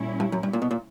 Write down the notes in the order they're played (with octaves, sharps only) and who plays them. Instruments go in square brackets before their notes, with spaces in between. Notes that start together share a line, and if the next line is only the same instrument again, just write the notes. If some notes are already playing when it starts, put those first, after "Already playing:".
Already playing: [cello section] A#2 G3 C#4 E4
[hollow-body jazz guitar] G2
F#2
G2
A#2
B2
A#2